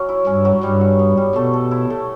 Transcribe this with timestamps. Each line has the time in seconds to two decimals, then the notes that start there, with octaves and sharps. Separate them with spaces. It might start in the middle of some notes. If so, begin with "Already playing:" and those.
Already playing: F#3 C#4
0.09 E4
0.27 G2 C#4
0.45 F#3
0.63 G2 G3
0.81 F#4
0.99 B3
1.17 G3
1.35 B2 A3
1.53 A4
1.71 E4
1.90 A3